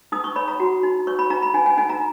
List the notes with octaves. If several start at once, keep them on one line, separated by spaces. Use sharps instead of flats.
D#4 D#6
C#6
C#5 B5
A#5
F#4
D#4
C#5 C#6
B5
D#4 A#5
B5
D#4 G#5
G#5
D#4 G#5
A#5